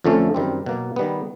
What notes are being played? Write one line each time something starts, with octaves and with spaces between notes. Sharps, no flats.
F2 D3 F3 A3 C#4
F#2 D#3 G3 C4
B2 F#3 A#3
D#3 G3 B3